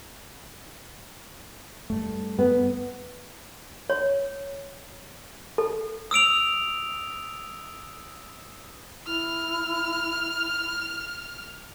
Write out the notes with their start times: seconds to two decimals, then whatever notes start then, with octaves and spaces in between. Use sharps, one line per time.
1.90 G2 A3
2.39 B3
3.90 C#5
5.58 A4
6.11 D#6 E6 D7 F7
9.07 E4 F6